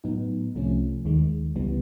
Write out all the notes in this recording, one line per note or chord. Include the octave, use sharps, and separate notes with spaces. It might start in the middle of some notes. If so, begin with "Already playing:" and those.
A2 F#3 B3 D#4
C2 C3 F3 A3 C#4
D#2 D#3 G#3
C#2 C#3 E3 G3 B3